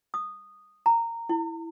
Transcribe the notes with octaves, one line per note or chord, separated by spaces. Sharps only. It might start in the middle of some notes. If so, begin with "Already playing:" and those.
D#6
A#5
E4